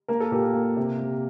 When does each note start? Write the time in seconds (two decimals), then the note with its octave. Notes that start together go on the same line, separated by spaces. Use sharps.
0.08 A#3 A#4
0.20 A4
0.31 A#2 G4 A#4
0.54 A#3
0.77 C3
1.00 C3